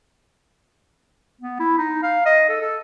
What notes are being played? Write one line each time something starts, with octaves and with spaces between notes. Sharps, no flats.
B3
E4
D#4
F5
D#5
A4
A4